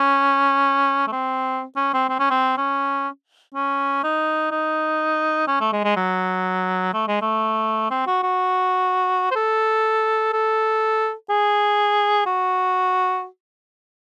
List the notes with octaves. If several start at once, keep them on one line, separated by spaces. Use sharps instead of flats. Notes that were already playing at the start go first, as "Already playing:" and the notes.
Already playing: C#4
A3
C4
C#4
C4
C4
C#4
C4
C#4
C#4
D#4
D#4
C#4
A3
G#3
G#3
F#3
A3
G#3
A3
C4
F#4
F#4
C5
A4
A4
G#4
F#4